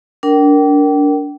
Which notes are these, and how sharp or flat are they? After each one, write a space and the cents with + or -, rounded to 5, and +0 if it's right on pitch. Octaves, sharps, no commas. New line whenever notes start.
D4 -25 A#4 +0 G5 -30